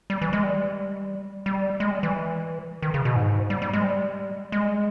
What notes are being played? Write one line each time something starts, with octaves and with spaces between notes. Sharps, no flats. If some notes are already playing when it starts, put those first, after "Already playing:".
G3
E3
G#3
G3
G3
G#3
G3
E3
D#3
C#3
B2
G#2
G3
G3
G#3
G3
G#3